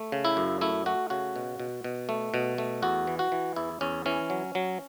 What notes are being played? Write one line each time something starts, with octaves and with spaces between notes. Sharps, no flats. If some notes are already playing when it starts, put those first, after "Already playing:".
Already playing: A3
C#3
E4
F#2
A3 E4
A3 F#4
C#3 F#4
B2
B2
B2
A3
B2
A3
E2 F#4
E3
F#4
E3
E2 E4
E2 C#4
E3 C#4
F#3
F#3